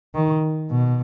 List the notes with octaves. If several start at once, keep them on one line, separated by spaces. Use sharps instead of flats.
D#3
B2